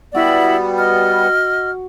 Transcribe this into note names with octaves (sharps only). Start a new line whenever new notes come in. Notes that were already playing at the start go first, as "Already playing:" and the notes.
G3 B3 E4 F#4 D5 E6
D#5 F6